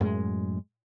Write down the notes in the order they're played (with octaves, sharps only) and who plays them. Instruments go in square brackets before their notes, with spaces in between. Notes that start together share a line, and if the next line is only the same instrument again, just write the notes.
[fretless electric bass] F#2 A2 G#3